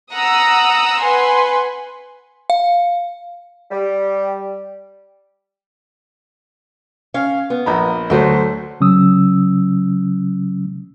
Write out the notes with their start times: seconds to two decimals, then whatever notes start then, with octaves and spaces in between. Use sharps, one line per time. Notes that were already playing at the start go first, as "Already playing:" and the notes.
0.13 F#5 A#5 D#6 E6
1.00 B4 F#5 G#5 C6
2.50 F5
3.71 G3
7.14 C#4 F5
7.50 B3
7.66 A#1 A#5 B5
8.10 D2 F#3 A3 F#4 C5
8.80 C#3 F#3 C#4 D#6 E6